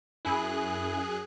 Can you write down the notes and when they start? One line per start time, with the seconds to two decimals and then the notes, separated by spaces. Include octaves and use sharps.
0.25 F#2 E4 G#4 F#6